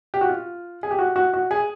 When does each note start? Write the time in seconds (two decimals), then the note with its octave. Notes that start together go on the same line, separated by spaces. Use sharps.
0.14 G4
0.21 F#4
0.29 F4
0.83 G#4
0.91 G4
0.99 F#4
1.16 F#4
1.34 F#4
1.51 G#4